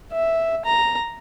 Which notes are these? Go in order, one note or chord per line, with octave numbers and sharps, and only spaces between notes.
E5
A#5